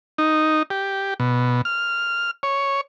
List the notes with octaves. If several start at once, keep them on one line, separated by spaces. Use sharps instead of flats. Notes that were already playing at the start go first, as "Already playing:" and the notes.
D#4
G4
B2
F6
C#5